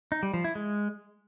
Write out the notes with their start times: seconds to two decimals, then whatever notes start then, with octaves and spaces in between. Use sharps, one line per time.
0.12 D#4
0.23 G3
0.34 F3
0.44 E4
0.55 G#3